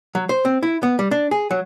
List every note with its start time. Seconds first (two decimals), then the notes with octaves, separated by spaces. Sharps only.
0.15 F#3
0.29 C5
0.45 C4
0.63 E4
0.83 B3
0.99 G3
1.11 D4
1.31 G#4
1.51 F#3